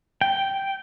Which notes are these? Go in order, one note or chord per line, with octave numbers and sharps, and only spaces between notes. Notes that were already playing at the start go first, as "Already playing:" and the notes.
G5